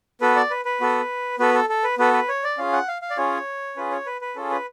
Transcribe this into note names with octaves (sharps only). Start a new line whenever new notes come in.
B3 F#4 A4 B4
D5
B4
B4
B3 F#4 A4
B3 F#4 A4 B4
A4
A4
B4
B3 F#4 A4 B4
B4
C#5
D5
C#4 F4 G#4 F5
F#5
F5
F5
D5
C#4 F4 G#4 C#5
C#4 F4 G#4 B4
C#5
B4
B4
C#4 F4 G#4 A4
B4